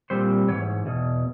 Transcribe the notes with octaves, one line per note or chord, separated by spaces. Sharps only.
A#2 G3 C4 C5
G#2 E3 C#5
E2 B2